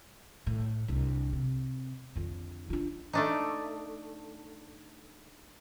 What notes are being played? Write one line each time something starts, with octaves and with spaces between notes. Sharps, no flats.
A2
C2 D4
C3
F2 D3
D4 F4
A3 D4 D#4